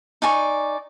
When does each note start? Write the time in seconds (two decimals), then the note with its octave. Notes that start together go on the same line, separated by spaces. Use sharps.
0.22 D#4 D5 G#5 C#6